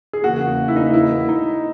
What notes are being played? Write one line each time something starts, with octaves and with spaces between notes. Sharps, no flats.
G#4
E2 C#3 E3 A#3 F#4
E4
D#4
E4
D#4